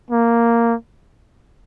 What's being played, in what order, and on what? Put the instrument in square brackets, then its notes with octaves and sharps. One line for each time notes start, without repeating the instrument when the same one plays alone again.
[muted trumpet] A#3